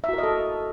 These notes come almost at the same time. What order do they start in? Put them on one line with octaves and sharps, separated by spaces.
E5 F#4 A#4 D#5 A4